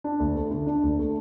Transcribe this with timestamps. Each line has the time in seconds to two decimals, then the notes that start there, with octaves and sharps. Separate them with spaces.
0.04 D4
0.20 D2
0.35 A3
0.51 D3
0.67 D4
0.83 D2
0.99 A3